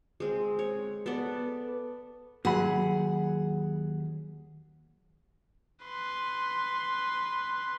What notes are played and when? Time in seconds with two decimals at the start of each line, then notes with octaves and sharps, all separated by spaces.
0.20 G#3 C4
0.59 C#5
1.06 B3 A4 B4 D5
2.45 D#2 F#3 G#4 F#5 B5
5.85 B4 C6